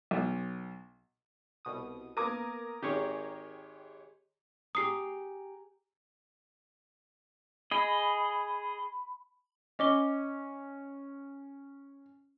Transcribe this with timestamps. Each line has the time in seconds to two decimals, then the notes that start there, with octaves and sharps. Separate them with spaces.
0.11 B1
1.65 C2 B2 D#6
2.17 A#3 B3 A#4 D6 D#6 G#6
2.83 G#1 G4 G#4 C#5
4.75 G4 G#5 A#5 D#6 C7
7.71 G#4 D#5 B5
9.79 C#4 D#5 D6 G7